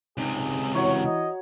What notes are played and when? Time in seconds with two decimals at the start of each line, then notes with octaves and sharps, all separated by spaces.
0.18 C#2 G#2 C3 G#4
0.75 E3 F#4 C#5 A#5 C#6
1.05 D#5